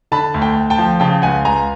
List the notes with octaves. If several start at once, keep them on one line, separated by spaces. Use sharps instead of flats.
D3 A5 B5
D2
G5 A5
D2
G5 A5
F3
C#3 G5 A5
C#2 F#5 G#5
C#2 G#5 A#5